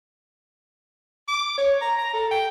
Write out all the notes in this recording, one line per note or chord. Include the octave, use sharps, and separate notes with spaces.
D6
C#5
A#5
A#5
A4
G5